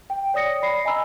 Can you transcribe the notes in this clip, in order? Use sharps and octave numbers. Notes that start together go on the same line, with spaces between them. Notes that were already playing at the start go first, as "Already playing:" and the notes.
G5
C#5 D5 D#6 A#6 C#7
D5 B5 C7
D#5 G#5 A#5 B5 E6